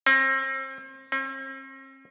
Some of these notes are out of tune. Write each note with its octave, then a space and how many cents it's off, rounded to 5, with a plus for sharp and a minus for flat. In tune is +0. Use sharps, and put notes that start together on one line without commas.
C4 +35
C4 +45